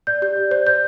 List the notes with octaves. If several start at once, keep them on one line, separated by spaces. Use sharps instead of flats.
D5 G6
G4 G6
D5
C5 G6
C5 G6